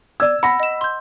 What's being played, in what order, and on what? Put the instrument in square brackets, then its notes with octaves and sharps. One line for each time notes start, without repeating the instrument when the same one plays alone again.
[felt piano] D5 E6 [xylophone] G#6
[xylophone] F#5 A#6 [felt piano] B5
[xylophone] D#5 E7
C6 G6